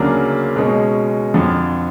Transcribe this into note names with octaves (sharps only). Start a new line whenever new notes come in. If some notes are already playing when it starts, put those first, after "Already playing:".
Already playing: D2 C#3 F#3 A#3 D4
B2 G#3 C#4
F2 D3 F3